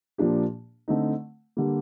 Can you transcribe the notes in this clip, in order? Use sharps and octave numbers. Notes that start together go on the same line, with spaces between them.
A#2 F3 A#3 D4 G4
D3 A3 C4 D#4
D3 G3 A#3